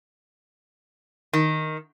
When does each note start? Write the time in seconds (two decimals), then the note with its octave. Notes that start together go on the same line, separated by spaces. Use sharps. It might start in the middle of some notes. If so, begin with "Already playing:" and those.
1.33 D#3